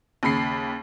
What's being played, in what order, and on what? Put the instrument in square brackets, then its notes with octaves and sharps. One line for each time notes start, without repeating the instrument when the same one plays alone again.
[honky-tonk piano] D#2 C#3 B5 C7